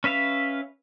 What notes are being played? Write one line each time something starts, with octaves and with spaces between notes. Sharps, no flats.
C#4 B4 E5 F5